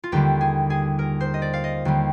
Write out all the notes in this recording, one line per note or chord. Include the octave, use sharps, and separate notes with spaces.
F4
D#2 D3 G3 G4
G#4
G#4
A#4
C5
D#5
D5
F5
D#5
D#2 D3 G3